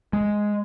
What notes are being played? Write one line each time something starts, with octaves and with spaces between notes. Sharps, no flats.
G#3